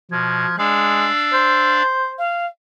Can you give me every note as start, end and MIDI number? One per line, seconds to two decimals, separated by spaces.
0.11 0.46 47
0.11 0.54 53
0.11 0.58 92
0.59 1.07 56
0.59 1.83 62
0.59 1.83 74
0.59 1.83 77
0.59 1.75 88
1.34 2.15 72
2.18 2.46 77